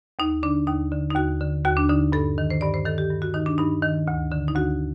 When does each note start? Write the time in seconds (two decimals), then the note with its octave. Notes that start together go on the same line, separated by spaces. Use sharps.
0.19 D#2 D#4
0.43 D3 D4
0.67 D#2 D#4
0.92 D3
1.11 D#4
1.15 D#2 F#4
1.41 D3
1.65 D#2 F#4
1.77 D4
1.89 D3 D#4
2.12 G2 A4
2.38 D#3
2.50 C5
2.61 G2 D5
2.74 C5
2.85 D#3 A4
2.98 G4
3.10 G2
3.22 F#4
3.34 D#3 D#4
3.46 D4
3.58 G2 D#4
3.83 D#3
4.08 D2
4.32 D3
4.48 D#4
4.56 D2 F#4